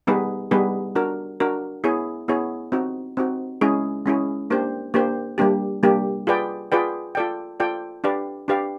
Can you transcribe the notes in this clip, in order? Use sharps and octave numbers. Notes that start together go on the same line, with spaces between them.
G3 B3 D#4 G#4 B4
G3 B3 D#4 G#4 B4
D4 F#4 A#4
D4 F#4 A#4
B3 E4 G#4 C#5
B3 E4 G#4 C#5
C4 D#4 F#4
C4 D#4 F#4
G#3 C#4 E4 G#4
G#3 C#4 E4 G#4
A#3 D4 G4 C5
A#3 D4 G4 C5
G3 A#3 D4 G4
G3 A#3 D4 G4
F4 G#4 B4 D5 G5
F4 G#4 B4 D5 G5
F4 A4 D5 G5
F4 A4 D5 G5
D4 G4 B4 D5 F5
D4 G4 B4 D5 F5